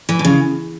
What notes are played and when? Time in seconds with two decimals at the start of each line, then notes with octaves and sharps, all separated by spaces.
0.09 E3
0.19 B2
0.25 C#3